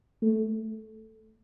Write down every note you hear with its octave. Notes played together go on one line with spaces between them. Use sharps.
A3